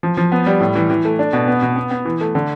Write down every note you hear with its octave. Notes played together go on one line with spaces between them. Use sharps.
F3
F3
B3
G3
A2
E3
E3
A3
D4
B2
B3
B2
B3
B3
E3
A3
D3